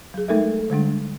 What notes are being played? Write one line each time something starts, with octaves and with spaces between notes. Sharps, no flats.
F#3 G#4
G#3 A3 D#4 A4 A#4 E5
D3 G3 G#3 D4